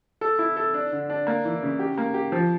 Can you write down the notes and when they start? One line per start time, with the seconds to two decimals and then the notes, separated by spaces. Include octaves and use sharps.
0.21 A4
0.39 E4
0.57 A4
0.74 D4
0.92 D3
1.10 D4
1.27 A#3
1.45 E3
1.63 C#3
1.79 G4
1.98 A#3
2.14 G4
2.32 F3